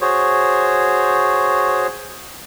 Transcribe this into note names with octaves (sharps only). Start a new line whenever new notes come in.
F#4 G#4 C5 C#5